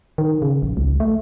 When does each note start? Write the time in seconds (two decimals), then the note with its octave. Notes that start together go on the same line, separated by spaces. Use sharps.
0.18 D#3
0.42 C#3
0.62 A#1
0.77 C#2
1.00 A3